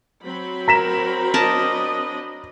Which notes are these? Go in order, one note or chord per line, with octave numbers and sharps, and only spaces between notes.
F#3 C4 B5
A#4 A#5 B6 E7
D4 A#4 D#5 A5